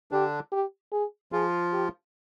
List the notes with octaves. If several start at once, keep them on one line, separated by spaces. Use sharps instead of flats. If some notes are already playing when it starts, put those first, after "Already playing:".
D3 D4 G4
G4
G#4
F3 F4 G#4
G4